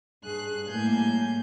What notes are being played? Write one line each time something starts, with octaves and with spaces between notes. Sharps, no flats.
G2 G#4 F#6
A2 G3 A#3 G#5 G6